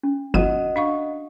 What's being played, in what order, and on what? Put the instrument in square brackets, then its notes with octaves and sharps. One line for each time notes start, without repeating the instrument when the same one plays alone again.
[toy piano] C#4
[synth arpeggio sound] G1 F2 D#7 [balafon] F#4 [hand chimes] D#5 F#5
[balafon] D4 F5 C#6